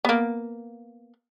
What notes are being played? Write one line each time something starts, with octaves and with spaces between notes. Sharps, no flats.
A#3 B3